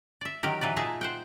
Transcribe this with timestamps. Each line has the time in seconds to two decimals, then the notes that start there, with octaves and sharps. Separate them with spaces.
0.21 D5 E5
0.43 D#3 F#3 G4 A#4
0.61 A2 E3 F#3 B4 D5
0.76 A#2 D#4 G#4 E5 A5 A#5
1.01 C5 F#5 G5